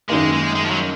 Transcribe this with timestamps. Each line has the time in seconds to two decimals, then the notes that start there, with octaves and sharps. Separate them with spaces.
0.09 F#2 D#3 G#3 A#3
0.33 G#3
0.55 G#3
0.64 F3
0.70 F#3